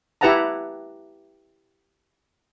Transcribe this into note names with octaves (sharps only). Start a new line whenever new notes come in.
E4 G4 B4 F#5 A5 A#5